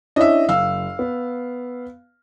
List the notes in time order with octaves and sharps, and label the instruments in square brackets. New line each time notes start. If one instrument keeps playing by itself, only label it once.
[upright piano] C#4 D4 E4 [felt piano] D#5 E5
[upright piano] F#1 [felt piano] F5 E6
[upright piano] B3